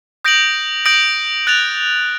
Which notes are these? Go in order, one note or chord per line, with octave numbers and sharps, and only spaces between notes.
D#6 G6 A#6 D7 F#7
D#6 G6 A#6 D7 F#7
F#6 A6 D7 F7